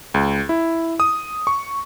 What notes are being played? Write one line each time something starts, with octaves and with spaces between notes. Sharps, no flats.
C#2
E4
D#6
C#6